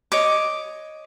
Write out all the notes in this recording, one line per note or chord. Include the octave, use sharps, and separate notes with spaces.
C#5 D#5 D6